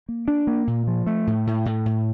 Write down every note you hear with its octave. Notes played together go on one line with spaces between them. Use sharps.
A#3
D4
A#3
A#2
F3
A3
A2
A2
A2
A2